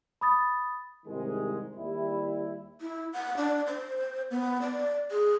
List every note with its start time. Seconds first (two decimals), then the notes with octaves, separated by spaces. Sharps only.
0.21 B5 D#6 A6
1.06 C2 G#2 D#3 G3 G#3
1.76 D#2 G3 E4
2.81 E4
3.13 F#5
3.37 D4
3.67 C5
4.31 B3
4.62 D5
5.11 G#4